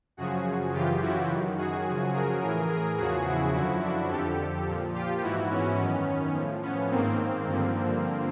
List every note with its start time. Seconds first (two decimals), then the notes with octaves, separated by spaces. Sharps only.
0.17 F#2 C#3 F3 F#4 G#4
0.73 F#2 C#3 E3 F4 G4
1.01 E4 F#4
1.30 F#2 D#3
1.57 F#4 G#4
1.86 F#2 C#3 F3
2.13 G#4 A#4
2.41 A2 E3 G#4 A#4
2.69 G#4 A#4
2.98 E2 C#3 F3 F#4 G#4
3.26 E4 F#4
3.54 F#2 D3 F3 E4 F#4
3.82 D4 E4
4.10 F2 D3 F3 G4 A4
4.66 A#2 F3
4.94 F4 G4
5.22 G#2 E3 E4 F#4
5.50 B3 C#4
5.79 F#2 D#3
6.35 A2 F3
6.62 B3 C#4
6.90 G#2 D#3 A#3 C4
7.47 G2 D3 F3